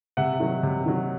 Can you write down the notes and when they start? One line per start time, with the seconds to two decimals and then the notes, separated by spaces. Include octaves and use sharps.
0.17 C3 E5 F#5
0.40 D#3 F#3
0.63 C3
0.86 D#3 F#3